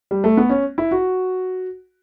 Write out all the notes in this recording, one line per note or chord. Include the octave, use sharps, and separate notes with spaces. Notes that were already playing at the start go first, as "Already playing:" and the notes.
G3
A3
B3
C#4
E4
F#4